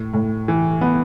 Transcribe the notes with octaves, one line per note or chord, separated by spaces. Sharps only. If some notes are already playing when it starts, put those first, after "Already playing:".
Already playing: A2
A2
E3
B3